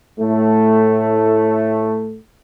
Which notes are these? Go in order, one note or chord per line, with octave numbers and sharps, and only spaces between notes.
A2 A3